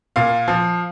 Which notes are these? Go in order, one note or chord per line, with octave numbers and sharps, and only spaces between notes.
A#2 F5
F3